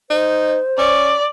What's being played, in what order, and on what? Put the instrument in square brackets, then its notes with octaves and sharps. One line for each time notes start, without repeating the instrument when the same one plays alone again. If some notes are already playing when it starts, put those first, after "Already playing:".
[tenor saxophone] D#4 [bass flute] C5
[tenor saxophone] C#4 [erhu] D5